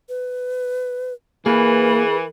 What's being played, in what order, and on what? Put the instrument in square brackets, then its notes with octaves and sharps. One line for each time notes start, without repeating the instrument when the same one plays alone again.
[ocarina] B4
[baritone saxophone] E3 [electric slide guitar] A#3 [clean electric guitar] G#4 B4 [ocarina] A#4